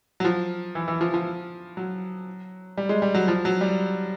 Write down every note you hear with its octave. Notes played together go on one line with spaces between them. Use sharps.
F#3
F3
E3
E3
F3
F3
F#3
G3
G#3
G3
F#3
F3
F#3
G3